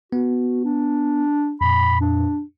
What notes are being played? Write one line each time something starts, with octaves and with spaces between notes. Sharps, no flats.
B3 F#4
D4
F2 A#2 B5
D4